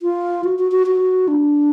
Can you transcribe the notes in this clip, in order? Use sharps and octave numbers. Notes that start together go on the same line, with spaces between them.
F4
F#4
F#4
F#4
F#4
D4